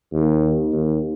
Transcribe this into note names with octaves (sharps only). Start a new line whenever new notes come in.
D#2
D#2